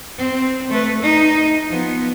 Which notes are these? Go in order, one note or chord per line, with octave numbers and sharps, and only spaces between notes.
C4
A3 B4
D#4
F3 B3